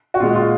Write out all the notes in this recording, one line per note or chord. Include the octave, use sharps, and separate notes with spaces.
F#4
A#2 G#3 F4
F4